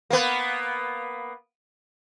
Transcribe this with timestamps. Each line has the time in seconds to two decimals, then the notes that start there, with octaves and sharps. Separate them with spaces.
0.10 A#3 B3